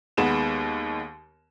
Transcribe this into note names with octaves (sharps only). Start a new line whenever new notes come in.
D#2 G#3 B3 E7